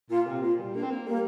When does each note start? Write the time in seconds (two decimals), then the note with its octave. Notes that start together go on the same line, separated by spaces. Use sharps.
0.10 A#2 F4
0.27 C3
0.42 A#2 F4
0.59 G3
0.75 A#3 D4
0.83 C4
0.90 A#3
1.07 G3 A#3